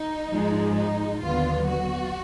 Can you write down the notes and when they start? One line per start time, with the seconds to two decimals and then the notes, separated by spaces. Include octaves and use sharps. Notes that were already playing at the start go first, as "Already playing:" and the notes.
Already playing: D#4
0.31 G#2 F3 G#3
0.75 D#4
1.21 D#2 D3 F#3 B3 F4
1.66 F#4